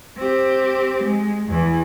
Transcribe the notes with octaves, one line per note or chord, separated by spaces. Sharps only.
C4 G4
G#3
E2 E3